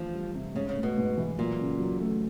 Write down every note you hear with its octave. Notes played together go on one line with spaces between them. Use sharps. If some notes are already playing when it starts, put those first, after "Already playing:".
Already playing: D2 E3 F3
G3
C3
G#2 C#3
C#3
A3
B2
G#2
E3
A#2 F#3
C#3
F#3
A3